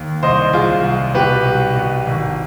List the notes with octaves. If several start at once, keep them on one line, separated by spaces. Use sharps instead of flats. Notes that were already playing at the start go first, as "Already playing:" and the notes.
Already playing: D#2
C2 C5 D#5
C2 F4 G#4
C2
B2 G4 B4
C2
B2
G#1